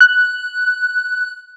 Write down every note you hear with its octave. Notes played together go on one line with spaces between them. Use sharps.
F#6